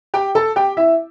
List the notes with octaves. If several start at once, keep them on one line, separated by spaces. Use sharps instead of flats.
G4 G5
A4 A5
G4 G5
E4 E5